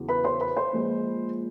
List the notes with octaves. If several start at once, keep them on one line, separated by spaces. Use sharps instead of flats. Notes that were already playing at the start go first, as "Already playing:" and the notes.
Already playing: E2 C#3 F#3
B4 B5
C5 C6
B4 B5
C5 C6
A#2 F3 G#3